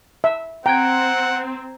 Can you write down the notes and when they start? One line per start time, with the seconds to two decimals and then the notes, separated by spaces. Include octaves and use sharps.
0.24 E5
0.66 C4 F#5 G5 A#5 G#6